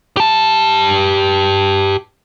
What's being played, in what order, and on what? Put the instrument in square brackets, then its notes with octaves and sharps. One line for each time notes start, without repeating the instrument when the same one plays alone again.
[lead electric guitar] G4 A5